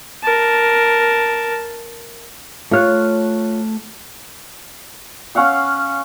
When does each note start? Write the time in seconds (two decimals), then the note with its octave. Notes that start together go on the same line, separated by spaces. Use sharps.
0.24 A#4 A5
2.71 A3 F4 C#5 F6 F#6
5.35 C#4 F5 F#5 E6